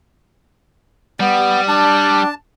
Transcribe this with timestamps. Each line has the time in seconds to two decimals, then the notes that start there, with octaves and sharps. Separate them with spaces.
1.20 G3 B3
1.68 D4 A5